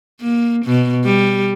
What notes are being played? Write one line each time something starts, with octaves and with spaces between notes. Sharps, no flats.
A#3
B2
G3